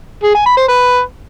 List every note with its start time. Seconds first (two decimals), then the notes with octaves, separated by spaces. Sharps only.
0.24 G#4
0.35 G#5
0.46 B5
0.57 C5
0.68 B4